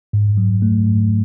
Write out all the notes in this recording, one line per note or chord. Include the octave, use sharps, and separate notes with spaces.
G#2
F#3
A3
G#2